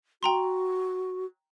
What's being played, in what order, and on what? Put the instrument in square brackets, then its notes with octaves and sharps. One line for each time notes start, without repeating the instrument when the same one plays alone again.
[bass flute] F#4 [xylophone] G5 A#5 C6